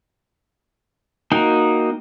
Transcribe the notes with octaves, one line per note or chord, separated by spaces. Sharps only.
A#3 D#4 F#4 G5